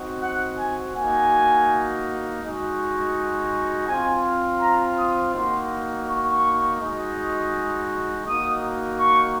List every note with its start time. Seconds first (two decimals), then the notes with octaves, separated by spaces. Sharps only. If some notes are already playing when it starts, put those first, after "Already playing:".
Already playing: C4 D#4 F#4
0.22 F#5
0.58 G#5
0.95 A#3 D#4 F#4 G#5
2.41 G#3 D#4 F#4
3.87 C4 F4 G#5
4.61 A#5
4.97 D#6
5.33 A#3 D#4 F#4 C6
6.06 C#6
6.80 G#3 D#4 F#4
8.26 A#3 D#4 F#4 D#6
8.99 C#6